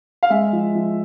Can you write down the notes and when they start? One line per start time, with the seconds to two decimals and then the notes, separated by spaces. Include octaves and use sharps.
0.23 F5
0.30 G#3 E5
0.53 F3
0.75 F3